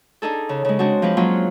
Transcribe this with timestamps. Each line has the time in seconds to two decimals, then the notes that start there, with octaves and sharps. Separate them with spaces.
0.22 D4 D#4 G#4 A4
0.49 C#3
0.65 C#3 G#3
0.79 G#3 C4 D4 F#4
1.02 F3 G#3 C4 B4
1.17 F#3 G#3 A#3 C4 C#4 F4